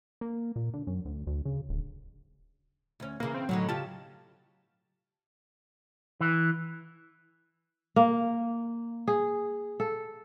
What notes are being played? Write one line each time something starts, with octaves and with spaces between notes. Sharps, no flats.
A#3
A#2
D3
F#2
D2
D2
C#3
D1
D2 C#4
C#3 E3 A#3
C4
A2 D3 F#3 D#4
C#3 F4 G4 A5
E3
A#3
G#4
A4